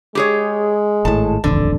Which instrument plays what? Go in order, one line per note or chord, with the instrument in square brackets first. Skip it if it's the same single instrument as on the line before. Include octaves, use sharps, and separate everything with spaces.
[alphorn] G#3 [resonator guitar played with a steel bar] G4 G#4 C#5
[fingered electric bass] G#1 A2 [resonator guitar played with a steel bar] A5
[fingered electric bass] D#1 A1 F2 [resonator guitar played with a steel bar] D3